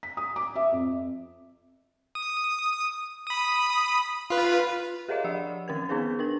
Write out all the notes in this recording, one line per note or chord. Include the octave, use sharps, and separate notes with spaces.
B6
D#6
D6
E5
F2
D#6
B5 D#6
F4 B4
G4 G#4 A#4 C#5 D#5 F5
F3 D5 F#5 E6
D#3 C#4 A#4 G#6
B3 D#4 G#4 B4
D4 A#4 F#7